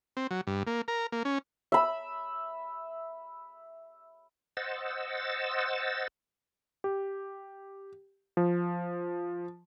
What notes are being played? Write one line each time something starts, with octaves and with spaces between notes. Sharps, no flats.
C4
F#3
G2
A#3
A#4
A#3
C#4
E5 B5
C5 D#5 F#5 E6 A6
G4
F3